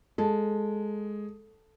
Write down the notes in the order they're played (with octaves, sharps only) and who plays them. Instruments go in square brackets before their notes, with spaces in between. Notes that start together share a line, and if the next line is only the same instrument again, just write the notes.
[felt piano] G#3 [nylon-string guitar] A4